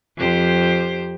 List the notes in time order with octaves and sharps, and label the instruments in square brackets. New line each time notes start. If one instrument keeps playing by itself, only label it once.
[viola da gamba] F2 G4 C5